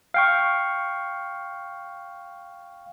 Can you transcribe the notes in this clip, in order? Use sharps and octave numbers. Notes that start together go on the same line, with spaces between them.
F5 G5 C#6